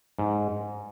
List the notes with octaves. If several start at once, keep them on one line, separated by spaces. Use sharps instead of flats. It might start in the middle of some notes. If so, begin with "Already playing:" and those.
G#2